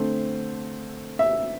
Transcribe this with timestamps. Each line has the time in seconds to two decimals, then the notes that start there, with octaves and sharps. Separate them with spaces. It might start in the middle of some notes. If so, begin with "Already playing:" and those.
Already playing: D3 A3 C4 C5
1.19 E5